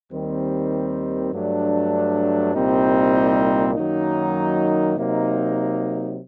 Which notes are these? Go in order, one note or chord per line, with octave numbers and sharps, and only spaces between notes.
D#2 D#3 G3 C4
G2 F#3 A3 D4
C2 A#2 G3 C4 D#4
F#2 D#3 F#3 A#3 D#4
C3 F#3 A#3 D#4